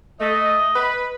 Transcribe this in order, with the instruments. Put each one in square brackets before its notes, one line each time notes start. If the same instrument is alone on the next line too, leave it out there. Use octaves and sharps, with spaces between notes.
[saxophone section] A3 [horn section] D#5
[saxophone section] B4